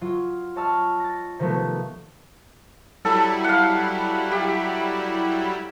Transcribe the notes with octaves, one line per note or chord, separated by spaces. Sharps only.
F#3 F4
C#5 D#5 A5 E6 F6
A6 A#6
C3 D#3 F3 F#3 A3 B3
F#3 G3 E4 A4
F5 F#5
G4